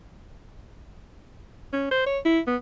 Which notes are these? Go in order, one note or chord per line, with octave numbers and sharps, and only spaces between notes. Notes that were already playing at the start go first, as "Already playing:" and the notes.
C#4
C5
C#5
E4
B3